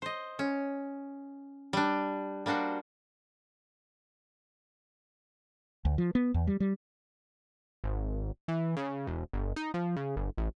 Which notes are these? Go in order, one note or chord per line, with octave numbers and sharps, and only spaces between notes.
C5 D#5
C#4
G3 D4
G3 A#3 D4 F#4 C5
D2
F3
B3
E2
G3
G3
G#1
E3
C#3
E1
G1
D#4
F3
C#3
G1
A1